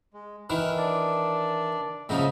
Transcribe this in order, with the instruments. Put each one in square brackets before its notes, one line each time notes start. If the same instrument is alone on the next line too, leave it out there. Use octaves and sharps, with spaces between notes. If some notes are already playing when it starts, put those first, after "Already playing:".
[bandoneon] G#3
[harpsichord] D#3 E3 [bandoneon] F6 F#6
[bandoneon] D4 D5
[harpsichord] G#2 C#3 F3 [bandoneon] D#5 E5